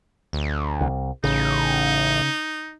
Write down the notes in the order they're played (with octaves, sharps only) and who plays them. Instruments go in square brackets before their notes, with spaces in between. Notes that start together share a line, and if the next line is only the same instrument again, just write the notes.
[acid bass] D2
[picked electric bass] C2
[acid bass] A1 [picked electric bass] C#3 [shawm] D#4